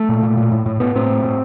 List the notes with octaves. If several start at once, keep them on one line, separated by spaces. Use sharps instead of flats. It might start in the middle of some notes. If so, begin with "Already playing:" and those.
Already playing: A3
A#2
A#2
A#2
A2
A2
A2 B3
A2 C4
A2
A2